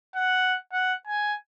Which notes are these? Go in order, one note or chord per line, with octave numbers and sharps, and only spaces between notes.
F#5
F#5
G#5